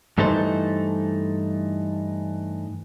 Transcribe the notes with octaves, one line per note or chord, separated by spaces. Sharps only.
G2 E3 A3 D#4 A4 C5